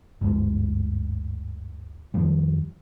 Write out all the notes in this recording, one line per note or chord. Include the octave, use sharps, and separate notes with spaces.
G1 D2 G#2 G#3
F2 D#3 F3 G3